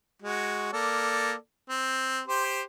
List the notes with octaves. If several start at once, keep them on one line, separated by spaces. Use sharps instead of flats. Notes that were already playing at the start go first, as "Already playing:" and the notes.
G#3 F#4
A#3 A4 D5
C4
G4 C5